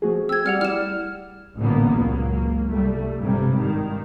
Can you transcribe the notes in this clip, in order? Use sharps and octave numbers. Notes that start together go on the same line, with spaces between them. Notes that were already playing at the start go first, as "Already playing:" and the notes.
F3 A3 F#4 G#4
C4 E6 G#6
G3 G4 F#5 F6
G3 E4 F6 E7
A1 G2 A#2 D3 A#3 B3
C#2 F#3 A#3
C2 G3 A3
G#1 G2 C3 G3
G2 D#3